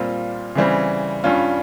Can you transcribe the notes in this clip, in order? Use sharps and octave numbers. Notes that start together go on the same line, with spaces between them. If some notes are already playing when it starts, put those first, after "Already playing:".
Already playing: A#2 G3 C4 F4
C#3 E3 G3 C4
G2 G3 C#4 F4